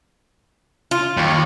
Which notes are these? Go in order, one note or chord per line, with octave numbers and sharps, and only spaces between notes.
F4
D#2